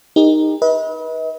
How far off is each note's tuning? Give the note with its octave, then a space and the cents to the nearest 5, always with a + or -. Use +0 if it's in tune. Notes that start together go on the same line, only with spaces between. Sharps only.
D#4 +0 G4 +35 A#4 +0
B4 -25 D#5 +40